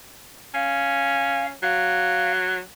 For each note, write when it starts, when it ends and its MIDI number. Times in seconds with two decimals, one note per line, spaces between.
0.54 1.53 61
0.54 1.46 77
1.63 2.60 54
1.63 2.32 77